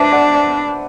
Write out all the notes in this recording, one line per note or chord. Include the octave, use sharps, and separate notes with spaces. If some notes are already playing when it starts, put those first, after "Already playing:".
Already playing: D4 B4 C5 E5
D5 F#5
D5